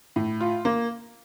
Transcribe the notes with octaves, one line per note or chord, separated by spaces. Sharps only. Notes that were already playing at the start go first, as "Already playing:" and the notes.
A2
F4
A#3